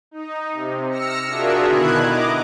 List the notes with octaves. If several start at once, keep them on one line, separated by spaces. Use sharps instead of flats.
D#4
C3
E6 F6 A#6 C#7
D4 F4 F#4 G#4 A#4 E5
B2 D3 D#3 E4 F#6 G#6
D#5 A#5 D6